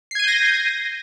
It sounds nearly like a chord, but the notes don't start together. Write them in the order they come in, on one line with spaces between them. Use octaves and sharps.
C7 G#6 D#7 G6 A#6